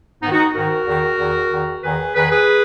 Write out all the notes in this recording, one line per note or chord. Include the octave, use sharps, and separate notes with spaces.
G#2 D#3 B3 D#4
D#4 F#4
G#2 D#3 F#4 A#4
E2 D#3
E2 D#3
E2 D#3
E2 D#3 G#4 B4
E2 D#3 G#4 B4
G#4 B4